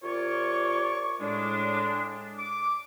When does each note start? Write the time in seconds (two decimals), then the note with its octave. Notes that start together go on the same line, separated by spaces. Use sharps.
0.04 C3 F4 A#4 C#5 D5 C#6
1.20 A2 G#3 D4
2.38 D6